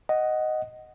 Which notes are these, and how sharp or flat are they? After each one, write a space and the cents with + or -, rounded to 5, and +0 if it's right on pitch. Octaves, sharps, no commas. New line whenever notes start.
D#5 +0 F#5 +10